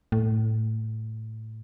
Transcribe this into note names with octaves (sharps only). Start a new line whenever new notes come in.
A2